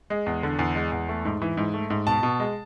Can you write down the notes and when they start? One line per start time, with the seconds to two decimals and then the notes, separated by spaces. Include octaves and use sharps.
0.10 G#3
0.26 E2
0.43 D3
0.59 E2
0.75 G#3
0.92 E2
1.09 A3
1.25 G#2
1.42 E3
1.57 G#2
1.74 A3
1.90 G#2
2.07 B2 A5
2.23 B2
2.40 G#3